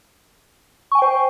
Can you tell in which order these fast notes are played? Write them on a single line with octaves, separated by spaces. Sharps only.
C#6 G#5 G5 C5